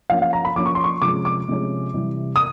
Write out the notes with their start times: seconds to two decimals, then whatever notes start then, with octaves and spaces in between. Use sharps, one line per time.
0.10 F3 A#3 C#4 F5
0.22 F5
0.33 A#5
0.45 B5
0.56 F3 A#3 C#4 D6
0.66 C#6
0.75 C6
0.84 C#6
1.01 C3 F3 G#3 C#4 D6
1.25 D6
1.48 C3 F3 G#3 C#4
1.94 C3 E3 G3
2.36 D#6